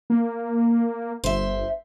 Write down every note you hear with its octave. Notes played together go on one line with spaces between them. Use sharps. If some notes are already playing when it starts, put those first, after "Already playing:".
A#3
G1 C5 E5